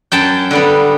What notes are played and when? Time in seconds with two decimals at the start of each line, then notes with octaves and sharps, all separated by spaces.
0.12 F#2 G5 A5
0.51 D3 G3 B3